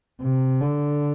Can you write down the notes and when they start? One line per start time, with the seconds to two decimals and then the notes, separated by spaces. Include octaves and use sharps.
0.21 C3
0.61 D3